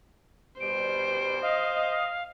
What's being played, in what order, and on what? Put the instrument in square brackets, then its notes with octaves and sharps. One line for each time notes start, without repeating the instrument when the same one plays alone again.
[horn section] B2 G3 [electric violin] C5 [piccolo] D7
[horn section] D#5 [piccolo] F5